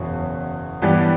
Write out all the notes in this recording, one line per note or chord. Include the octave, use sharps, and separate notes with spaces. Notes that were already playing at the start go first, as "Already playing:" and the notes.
Already playing: F#1 E2 B2 F#3
G2 E3 B3 D4 G4